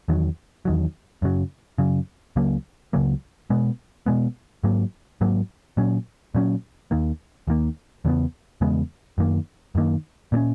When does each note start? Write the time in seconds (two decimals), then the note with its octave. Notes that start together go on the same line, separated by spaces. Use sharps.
0.08 E2 D#3 F#3
0.65 E2 D#3 F#3
1.22 F#2 C#3 F#3
1.78 F#2 C#3 F#3
2.36 C#2 C#3 F#3 A#3
2.93 C#2 C#3 F#3 A#3
3.50 B2 G#3 B3
4.06 B2 G#3 B3
4.64 G#2 F#3 A#3
5.21 G#2 F#3 A#3
5.77 A#2 F#3 C#4
6.35 A#2 F#3 C#4
6.91 D#2 D#3 A#3
7.47 D#2 D#3 A#3
8.05 E2 C#3 G#3 B3
8.61 E2 C#3 G#3 B3
9.18 F#2 D#3 A#3
9.75 F#2 D#3 A#3
10.32 A#2 A#3
10.36 C#4